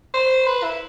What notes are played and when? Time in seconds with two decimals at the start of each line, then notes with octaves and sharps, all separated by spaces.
0.14 C5
0.47 B4
0.63 E4